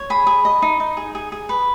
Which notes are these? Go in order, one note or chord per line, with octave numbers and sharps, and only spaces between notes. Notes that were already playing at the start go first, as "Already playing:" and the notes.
Already playing: C#5
G#4 B5
G#4
D#5
D#4
D#4
G#4
G#4
G#4
B4